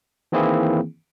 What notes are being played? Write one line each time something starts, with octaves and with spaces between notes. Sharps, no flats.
D#3 E3 A#3 C4 E4 G#4